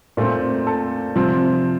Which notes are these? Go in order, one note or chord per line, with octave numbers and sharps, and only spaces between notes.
A#2 A3 C4
A4
C3 F3 C4